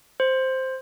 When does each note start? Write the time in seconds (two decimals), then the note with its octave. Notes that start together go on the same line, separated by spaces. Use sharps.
0.20 C5